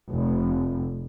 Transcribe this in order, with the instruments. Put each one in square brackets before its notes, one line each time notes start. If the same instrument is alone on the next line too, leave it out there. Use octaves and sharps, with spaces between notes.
[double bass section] F1